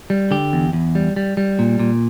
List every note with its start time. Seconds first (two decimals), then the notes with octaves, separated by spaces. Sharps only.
0.10 G3
0.31 D3 G4
0.53 E2
0.73 E2
0.95 G3
1.16 G3
1.37 G3
1.59 A#2
1.79 A#2